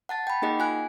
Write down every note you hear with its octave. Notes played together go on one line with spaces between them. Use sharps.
F#5 A5 A6
G5 B5
A#3 D#4 G#4 D#5 F#5
F4 G#5 F#6